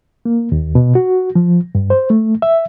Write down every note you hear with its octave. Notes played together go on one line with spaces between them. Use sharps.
A#3
D#2
B2
F#4
F3
G2
C5
A3
E5